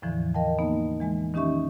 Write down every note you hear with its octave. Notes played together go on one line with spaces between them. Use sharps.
E2 A2 D3 E3 F3
A#4 D#5 F5 G5 A5
A#3 B3 D#4
E3 G#3 G#5
D#3 C#4 D#4 G4 E5 C#6